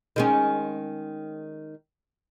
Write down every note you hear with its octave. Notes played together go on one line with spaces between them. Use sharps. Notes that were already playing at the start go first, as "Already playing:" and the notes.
D#3 G#3 C#4